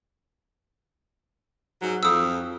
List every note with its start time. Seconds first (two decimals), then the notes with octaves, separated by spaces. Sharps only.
1.82 G#2 F#3
2.03 F2 D#6 E6